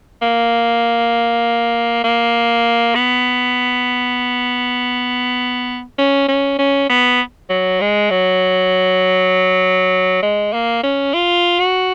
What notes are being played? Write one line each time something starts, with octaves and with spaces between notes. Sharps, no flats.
A#3
A#3
B3
C#4
C#4
C#4
B3
F#3
G#3
F#3
G#3
A#3
C#4
F4
F#4